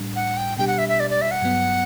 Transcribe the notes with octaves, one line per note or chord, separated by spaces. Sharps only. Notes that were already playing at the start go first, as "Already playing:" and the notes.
Already playing: A2 G3 D4
F#5
G5
B2 G3 D4 G4 G5
F#5
E5
E5
D5
D5
E5
F#5
G2 F#3 B3